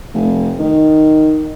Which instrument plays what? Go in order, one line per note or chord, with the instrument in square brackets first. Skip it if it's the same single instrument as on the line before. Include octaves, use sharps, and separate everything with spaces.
[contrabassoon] F1
D#3